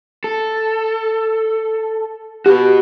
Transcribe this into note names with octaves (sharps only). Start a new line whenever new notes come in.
A4
F#4 G4 B4